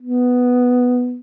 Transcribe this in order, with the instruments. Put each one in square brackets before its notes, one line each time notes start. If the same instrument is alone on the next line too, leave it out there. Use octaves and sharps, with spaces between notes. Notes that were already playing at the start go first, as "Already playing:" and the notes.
[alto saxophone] B3